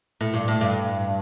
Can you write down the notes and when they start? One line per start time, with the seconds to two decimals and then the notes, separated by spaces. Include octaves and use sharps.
0.21 A2
0.34 G2
0.48 A2
0.61 G2